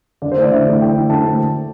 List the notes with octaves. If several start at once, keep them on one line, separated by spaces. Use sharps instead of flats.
D3 D5
C5
A3 E4 D5
D3 E5
A3 E4
D3 G5
A3 E4
D3 A5
A3